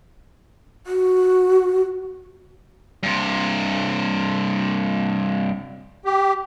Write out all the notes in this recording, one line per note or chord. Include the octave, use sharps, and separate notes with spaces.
F#4
G2 C3
G4